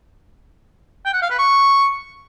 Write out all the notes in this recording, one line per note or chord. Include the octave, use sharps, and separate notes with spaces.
G5
F#5
F5
B4
C#6